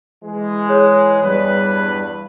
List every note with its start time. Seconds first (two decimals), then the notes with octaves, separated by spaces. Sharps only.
0.24 E3 G#3
0.69 G#4 C#5 F#6
1.23 E2 G2 G3 B4